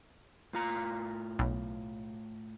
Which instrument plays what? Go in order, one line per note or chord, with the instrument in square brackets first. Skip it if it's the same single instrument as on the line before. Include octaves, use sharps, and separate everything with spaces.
[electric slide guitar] A2 F4 A#5
[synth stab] B1